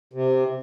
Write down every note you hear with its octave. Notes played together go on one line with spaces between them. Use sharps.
C3